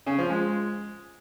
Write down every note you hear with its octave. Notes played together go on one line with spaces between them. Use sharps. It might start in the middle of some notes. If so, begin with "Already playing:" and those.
C#3
F3
G#3